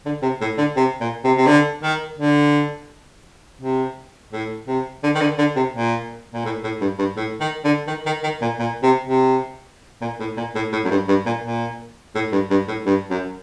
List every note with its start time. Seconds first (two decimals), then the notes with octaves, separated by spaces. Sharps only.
0.05 D3
0.22 C3
0.41 A2
0.58 D3
0.76 C3
1.00 A#2
1.24 C3
1.37 C3
1.47 D3
1.83 D#3
2.18 D3
3.61 C3
4.32 A2
4.67 C3
5.03 D3
5.15 D#3
5.21 D3
5.38 D3
5.56 C3
5.74 A#2
6.33 A#2
6.45 A2
6.63 A2
6.81 G2
6.99 G2
7.16 A2
7.40 D#3
7.64 D3
7.87 D#3
8.06 D#3
8.23 D#3
8.41 A#2
8.59 A#2
8.83 C3
9.07 C3
10.01 A#2
10.19 A2
10.37 A#2
10.55 A2
10.72 A2
10.85 F#2
10.91 G2
11.08 G2
11.26 A#2
11.43 A#2
12.15 A2
12.32 G2
12.50 G2
12.68 A2
12.86 G2
13.10 F#2